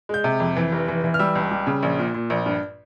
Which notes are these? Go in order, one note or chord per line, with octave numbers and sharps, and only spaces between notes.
G#3 G6
C3
F2
E3
F1
E3
E3
F6
G3 E6
C#2
G3
C#3
A#1
A#2
A#2
A#1
G2